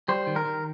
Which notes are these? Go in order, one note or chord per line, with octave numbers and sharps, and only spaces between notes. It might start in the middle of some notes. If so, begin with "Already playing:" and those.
G3 C5
D#3
A#4
D#3